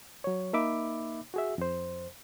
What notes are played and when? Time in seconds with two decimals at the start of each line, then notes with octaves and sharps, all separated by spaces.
0.24 F#3 C#5
0.53 A#3 D#4 E5 B5 D6
1.34 F#4 G#4 E5
1.58 F2 C5